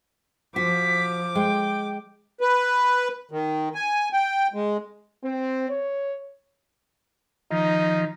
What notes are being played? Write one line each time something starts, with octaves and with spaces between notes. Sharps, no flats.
F3 F#4 D6 B6
G#3 G5
B4
D#3
G#5
G5
G#3
C4
C#5
D#3 F3 D#4